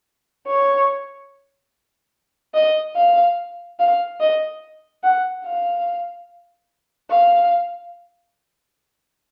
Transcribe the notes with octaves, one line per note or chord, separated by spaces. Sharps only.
C#5
D#5
F5
F5
D#5
F#5
F5
F5